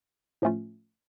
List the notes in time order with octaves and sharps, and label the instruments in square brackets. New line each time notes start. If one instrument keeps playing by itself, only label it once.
[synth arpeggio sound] A2 F3 A3 C#4 F4